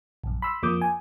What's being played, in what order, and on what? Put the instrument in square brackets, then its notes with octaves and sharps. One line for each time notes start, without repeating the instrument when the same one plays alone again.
[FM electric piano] A#1 F#2
B5 C6 E6
F2 F3 A#3 D6 D#6 G6
G#5